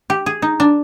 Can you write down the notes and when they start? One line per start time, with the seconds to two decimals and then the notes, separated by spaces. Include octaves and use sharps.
0.10 G4
0.26 G#4
0.42 D#4
0.60 D4